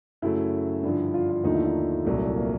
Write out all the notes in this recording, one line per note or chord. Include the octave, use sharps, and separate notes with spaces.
F#2 C#3 F#3 A3 E4
G2 D3 F3
F4
F4
D#2 D3 F3 A3 D#4
E4
E4
C2 A#2 F#3 A3
A#3